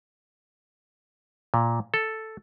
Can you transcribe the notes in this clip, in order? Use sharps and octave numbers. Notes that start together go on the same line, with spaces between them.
A#2
A4